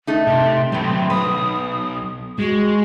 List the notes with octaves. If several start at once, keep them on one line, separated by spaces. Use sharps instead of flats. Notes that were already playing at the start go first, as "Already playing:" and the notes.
A3 D#4
C3 C6
F#3 A3 B3 C4
B1 B4 D#6
G#3 F#4